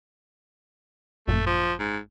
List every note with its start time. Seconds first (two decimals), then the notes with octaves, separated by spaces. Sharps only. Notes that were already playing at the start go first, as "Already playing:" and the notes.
1.28 G#1 F#2 A#2 A3
1.46 F3
1.79 G#2